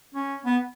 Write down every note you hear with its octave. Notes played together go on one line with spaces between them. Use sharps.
C#4
B3